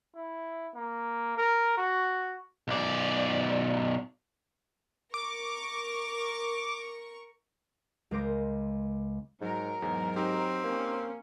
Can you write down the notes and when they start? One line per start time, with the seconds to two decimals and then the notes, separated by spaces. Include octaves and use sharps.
0.15 E4
0.75 A#3
1.38 A#4
1.77 F#4
2.68 B1 D5
5.14 A#4 C#6 D6
8.11 C#2 G#3 A#4 C5 D6 A#6
9.41 G#2 F#3 A#4
9.82 E2 G#2
10.16 C4 D#4 G4
10.64 A#3 C#4